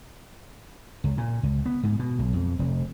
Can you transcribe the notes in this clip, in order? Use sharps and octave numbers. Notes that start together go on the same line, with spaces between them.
C#2
A#2
C#2
B3
G#2
B2
B1
F2
F1